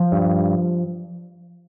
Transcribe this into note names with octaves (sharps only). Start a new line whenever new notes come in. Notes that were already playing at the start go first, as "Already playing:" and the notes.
Already playing: F3
G2